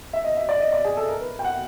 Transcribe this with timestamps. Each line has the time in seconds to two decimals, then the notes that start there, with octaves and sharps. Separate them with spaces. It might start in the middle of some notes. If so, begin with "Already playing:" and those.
0.13 E5
0.24 D#5
0.37 E5
0.49 D5
0.60 D#5
0.73 D5
0.85 G#4
0.97 A4
1.09 A#4
1.20 B4
1.39 G5
1.44 F#5